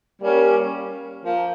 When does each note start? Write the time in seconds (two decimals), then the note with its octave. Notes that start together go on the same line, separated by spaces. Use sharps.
0.21 G3 A#3 C#4
1.23 F3 A#3